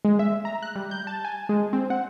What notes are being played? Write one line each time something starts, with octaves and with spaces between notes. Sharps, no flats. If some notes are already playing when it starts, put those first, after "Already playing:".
G#3
E5
A#5
F#6
G3
G6
A5
G#5
G#3
C4
F#5